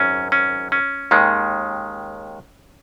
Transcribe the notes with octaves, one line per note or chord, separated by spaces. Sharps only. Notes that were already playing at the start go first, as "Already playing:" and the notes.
Already playing: G#1 F#2 C#4
C#4
C#4
D#2 D#3 G#3